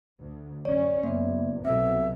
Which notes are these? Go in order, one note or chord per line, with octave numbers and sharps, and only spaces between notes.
D2
F#2 C#4 C#5 D5
F#1 A#3 B3 D5 E5
C2 B2 F#3 C4 A4 E5